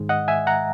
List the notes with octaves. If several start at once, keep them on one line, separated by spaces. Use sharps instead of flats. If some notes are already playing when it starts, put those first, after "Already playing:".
Already playing: G#2 D#3 G#3
D#5 F#5
E5 G#5
F#5 A#5